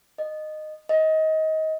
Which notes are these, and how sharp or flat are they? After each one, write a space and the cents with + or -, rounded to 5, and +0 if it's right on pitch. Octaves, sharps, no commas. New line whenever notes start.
D#5 -15
D#5 +25